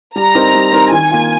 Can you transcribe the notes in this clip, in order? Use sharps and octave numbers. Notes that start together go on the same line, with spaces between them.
G3 A#5
C4 D#4 A#4
G3
C4 D#4 A#4
D#3 G#5
A#3 F4